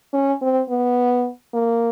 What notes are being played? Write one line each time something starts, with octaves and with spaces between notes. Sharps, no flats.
C#4
C4
B3
A#3